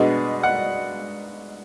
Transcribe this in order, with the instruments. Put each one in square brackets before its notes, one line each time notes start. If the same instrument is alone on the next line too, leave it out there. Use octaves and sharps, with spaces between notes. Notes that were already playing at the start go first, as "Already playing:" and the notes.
Already playing: [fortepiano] B2 G#3 B3 D4
F#5